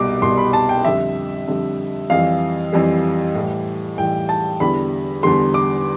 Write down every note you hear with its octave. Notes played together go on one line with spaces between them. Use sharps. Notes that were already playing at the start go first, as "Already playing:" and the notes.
Already playing: C2 B2 G3 D6
C2 B2 G3 C6
B5
A5
G5
F2 D3 G3 E5
F2 D3 G3
F2 E3 G3 F5
F2 E3 G3
A2 E3 G3
A2 E3 G3 G5
A5
E2 D3 G3 B5
E2 D3 G3 C6
D6